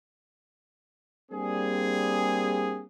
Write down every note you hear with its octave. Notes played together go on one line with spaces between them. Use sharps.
G3 A#3 C4 D4 G#4